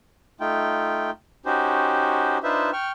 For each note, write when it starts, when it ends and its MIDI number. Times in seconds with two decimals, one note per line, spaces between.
0.40 1.10 57
0.40 1.10 63
0.40 1.10 65
0.40 1.10 79
1.46 2.38 61
1.46 2.38 63
1.46 2.38 66
1.46 2.38 67
1.46 2.38 72
2.43 2.70 62
2.43 2.70 63
2.43 2.70 65
2.43 2.70 71
2.43 2.70 72
2.43 2.70 76
2.73 2.92 79
2.73 2.92 85
2.73 2.92 89